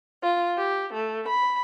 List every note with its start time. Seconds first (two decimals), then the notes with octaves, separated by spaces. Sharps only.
0.21 F4
0.55 G4
0.92 A3
1.27 B5